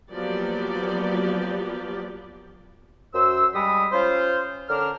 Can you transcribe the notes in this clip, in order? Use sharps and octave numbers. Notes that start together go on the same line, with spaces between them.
F3 F#3 A#3 B3 G4 D5
F#2 C5 E6
G3 G#3 B5 D#6
C#4 F4 C5
D3 C#4 D4 A#4 F6